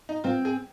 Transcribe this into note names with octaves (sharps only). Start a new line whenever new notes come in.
D#4
C4 F4
G#4